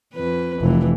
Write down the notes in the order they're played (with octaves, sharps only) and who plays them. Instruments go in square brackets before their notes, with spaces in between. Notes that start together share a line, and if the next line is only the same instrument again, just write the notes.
[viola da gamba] F2 B4
[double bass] F1 [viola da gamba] E3